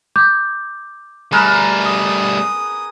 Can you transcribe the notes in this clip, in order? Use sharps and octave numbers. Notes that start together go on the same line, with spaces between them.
D6 G6
G3 A3 G#4 A#4 B4
D#6